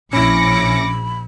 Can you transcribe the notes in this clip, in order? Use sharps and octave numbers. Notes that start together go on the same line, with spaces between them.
A#1 C#4 E4 B5 D6 A#6 C#7